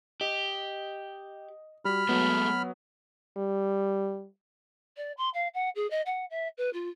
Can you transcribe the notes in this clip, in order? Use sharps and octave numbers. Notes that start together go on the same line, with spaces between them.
G4 D#5
G3 F#4 B5 F6
F#3 G#3 A3 B3
G3
D5
C6
F5
F#5
G#4
D#5
F#5
E5
B4
F4